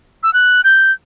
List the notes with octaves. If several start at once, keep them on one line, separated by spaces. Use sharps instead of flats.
E6
F#6
G6